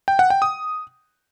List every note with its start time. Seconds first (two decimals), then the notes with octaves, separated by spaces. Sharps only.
0.08 G5
0.19 F#5
0.30 G5
0.42 D#6